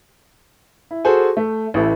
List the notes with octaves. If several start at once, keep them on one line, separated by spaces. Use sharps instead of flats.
E4
F#4 G#4 A4 C5 G#5
A3
A1 E3 A3 E4